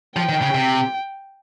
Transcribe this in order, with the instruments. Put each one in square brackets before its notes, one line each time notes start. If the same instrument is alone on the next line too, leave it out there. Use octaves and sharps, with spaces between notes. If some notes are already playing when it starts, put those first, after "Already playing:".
[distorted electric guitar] F3 [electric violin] G5
[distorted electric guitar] D#3
C#3
C3